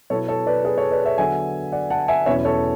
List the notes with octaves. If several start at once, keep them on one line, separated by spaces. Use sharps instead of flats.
B2 F#3 B3 E4 A4 C#5
A4 C#5
B4 D5
G#4 B4
A4 C#5
B4 D5
C#5 E5
D3 F#3 B3 E5 G#5
D5 F#5
F#5 A5
E5 G#5
E2 B2 F#3 C#4 E4 C#5 E5
A4 C#5